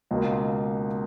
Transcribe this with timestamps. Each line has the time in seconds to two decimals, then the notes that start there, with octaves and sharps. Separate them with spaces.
0.11 C#2 B2 A#3